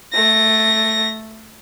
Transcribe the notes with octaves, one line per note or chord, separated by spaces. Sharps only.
A3 A#6